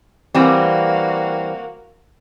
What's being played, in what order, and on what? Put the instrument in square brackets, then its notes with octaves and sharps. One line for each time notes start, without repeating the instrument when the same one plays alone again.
[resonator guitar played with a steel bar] E3 G3 C4 [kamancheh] A#3 F#4